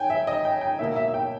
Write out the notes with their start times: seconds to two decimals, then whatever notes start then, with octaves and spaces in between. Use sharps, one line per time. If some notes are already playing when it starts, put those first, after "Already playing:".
Already playing: G5 G#5
0.10 E5
0.27 D#5
0.45 G5
0.61 G5
0.79 B2 A#3 E4 E5
0.96 E5
1.08 E5
1.14 G5